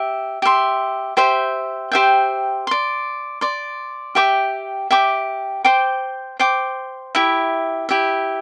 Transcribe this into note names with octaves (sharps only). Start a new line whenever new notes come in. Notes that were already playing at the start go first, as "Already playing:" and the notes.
Already playing: G4 E5
G4 E5 C6
G4 C5 E5 G5
G4 C5 E5 G5
D5 C6
D5 C6
G4 E5 G5 D6
G4 E5 G5 D6
C5 G5 D6
C5 G5 D6
E4 G4 E5
E4 G4 E5